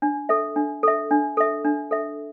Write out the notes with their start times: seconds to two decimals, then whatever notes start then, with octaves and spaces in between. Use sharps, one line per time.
0.02 D4
0.29 A4 E5
0.56 D4
0.83 A4 E5
1.11 D4
1.37 A4 E5
1.65 D4
1.91 A4 E5